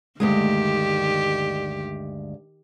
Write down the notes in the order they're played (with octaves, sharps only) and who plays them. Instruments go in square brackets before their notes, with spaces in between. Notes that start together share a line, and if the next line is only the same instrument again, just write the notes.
[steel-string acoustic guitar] D2 G2 G#3 [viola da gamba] D#3 G4